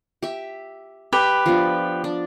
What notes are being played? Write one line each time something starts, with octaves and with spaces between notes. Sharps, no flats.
G4 E5
G4 B4
F3 B3 D4
D4